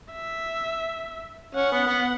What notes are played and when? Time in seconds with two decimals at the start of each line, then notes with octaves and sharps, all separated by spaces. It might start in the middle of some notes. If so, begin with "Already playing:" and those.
0.13 E5
1.55 C#4 F#5
1.72 B3
1.87 B3